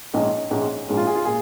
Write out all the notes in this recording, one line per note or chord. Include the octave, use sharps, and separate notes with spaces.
A#1 G#2 G#3 C#4 D#5
A#1 G#2 G#3 C#4
A#1 G#2 G#3 C#4
F4
G#4
F4
A#2 G#4